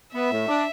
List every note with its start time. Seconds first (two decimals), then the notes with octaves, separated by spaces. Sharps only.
0.14 B3 E5
0.31 A2
0.48 D4